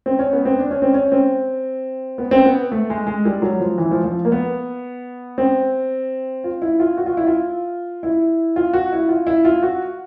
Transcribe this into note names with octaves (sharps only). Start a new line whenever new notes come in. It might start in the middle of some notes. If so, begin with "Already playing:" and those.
C4
C#4
B3
C4
D4
C#4
C4
C#4
C4
B3
C4
B3
A3
G#3
G#3
G3
F#3
F3
E3
F3
F3
A#3
B3
C4
F4
E4
F4
F#4
F4
E4
F4
E4
F4
F#4
E4
F4
E4
F4
F#4